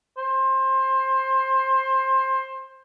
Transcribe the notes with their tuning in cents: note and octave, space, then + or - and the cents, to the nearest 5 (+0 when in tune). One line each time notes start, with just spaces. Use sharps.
C5 +20